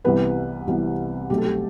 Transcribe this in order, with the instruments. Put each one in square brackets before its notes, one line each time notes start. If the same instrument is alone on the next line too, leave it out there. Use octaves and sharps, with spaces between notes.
[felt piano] C2 C3 E3 B3 B4
C2 C3 E3 B3
B1 B2 A3 C4 G4
A4
G4